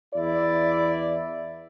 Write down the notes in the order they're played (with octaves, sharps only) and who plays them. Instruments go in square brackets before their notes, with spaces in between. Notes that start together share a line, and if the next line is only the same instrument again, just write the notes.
[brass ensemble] E2 E4 D5